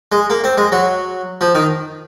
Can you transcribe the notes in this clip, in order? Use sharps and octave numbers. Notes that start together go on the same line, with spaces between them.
G#3
A#3
C4
G#3
F#3
F3
D#3